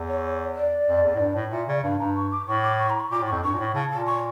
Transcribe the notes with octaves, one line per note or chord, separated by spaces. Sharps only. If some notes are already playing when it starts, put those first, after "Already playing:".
Already playing: E2
C#5
D5
F2
E2
A2
G2
A2
A#2 E5
C#3 D5
G2 F5
G2 A#5
C#6
D6
A2 C#6
D6
C#6
A#5
C#6
A#2 D6
A2
F2 C#6
G2 C#6
A#2
A2
C#3 A5
A#2 A5
C#6